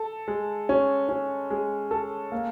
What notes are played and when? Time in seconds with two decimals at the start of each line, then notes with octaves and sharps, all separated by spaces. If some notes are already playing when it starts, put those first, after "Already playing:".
Already playing: A4
0.28 G#3
0.69 C#4
1.09 C#4
1.50 G#3
1.91 A4
2.32 A#3